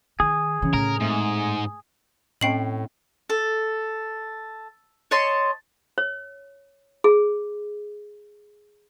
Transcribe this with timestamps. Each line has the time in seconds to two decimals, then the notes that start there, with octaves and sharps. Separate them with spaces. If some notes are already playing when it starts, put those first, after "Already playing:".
0.20 D#3 G#4
0.62 C#3 E3 C#4
0.74 A2 A#4
1.00 G#2 A3 C4 E5
2.41 A2 C4 C#4 D#5 G5 C7 F#7
3.30 A4
5.11 C#5 D#5 A5 C6
5.98 C#5
7.04 G#4